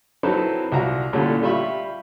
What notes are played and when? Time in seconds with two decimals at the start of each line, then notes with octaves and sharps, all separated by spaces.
0.23 F#3 C4 D#4 E4 A4 B4
0.72 C2 F4 F#4 A#5
1.13 A#2 D3 G3 A3 C#4 E4
1.43 G3 F4 E5 B5 C#6